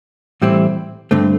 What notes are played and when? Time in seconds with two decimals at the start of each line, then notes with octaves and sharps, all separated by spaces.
0.42 A2 E3 G3 C4 E4
1.11 G2 D3 A3 C4